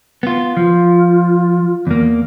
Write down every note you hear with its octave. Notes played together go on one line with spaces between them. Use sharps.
B3 F4
F3 F4
E2 A#3